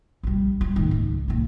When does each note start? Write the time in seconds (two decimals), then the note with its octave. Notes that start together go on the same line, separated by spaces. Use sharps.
0.23 A#1 G3
0.61 G3
0.76 A2 D#3
0.91 C#2
1.28 A#2 D#3